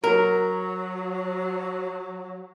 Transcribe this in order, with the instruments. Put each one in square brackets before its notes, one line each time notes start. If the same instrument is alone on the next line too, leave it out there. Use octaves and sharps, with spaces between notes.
[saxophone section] F#3 [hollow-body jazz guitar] A#4